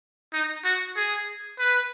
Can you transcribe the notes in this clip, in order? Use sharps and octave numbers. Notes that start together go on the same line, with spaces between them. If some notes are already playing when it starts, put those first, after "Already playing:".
D#4
F#4
G#4
B4